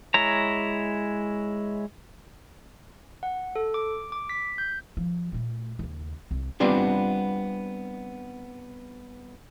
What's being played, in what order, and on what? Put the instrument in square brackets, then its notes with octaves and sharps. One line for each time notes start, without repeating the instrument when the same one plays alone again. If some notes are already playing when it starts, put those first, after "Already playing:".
[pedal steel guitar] G#3 E4 C#5 A#5
[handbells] F#5
A4
D6
D6
B6
G6
[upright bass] F3
A#2 A3
D#2 C#3
C2
[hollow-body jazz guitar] G3 B3 C4 D4 F4